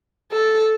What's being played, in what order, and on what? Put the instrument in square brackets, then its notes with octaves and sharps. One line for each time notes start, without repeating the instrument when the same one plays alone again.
[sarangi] A4